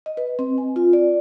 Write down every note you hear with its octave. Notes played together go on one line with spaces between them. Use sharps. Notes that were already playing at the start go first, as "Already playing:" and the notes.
D#5
B4
C4
G#5
F4
D5